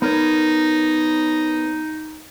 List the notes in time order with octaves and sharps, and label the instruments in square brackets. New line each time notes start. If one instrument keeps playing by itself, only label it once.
[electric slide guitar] B3 A#4 C#5 [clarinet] D#4